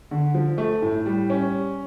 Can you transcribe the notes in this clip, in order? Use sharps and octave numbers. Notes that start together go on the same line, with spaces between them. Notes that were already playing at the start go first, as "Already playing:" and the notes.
D3
F3
A3
A2
G3
C#4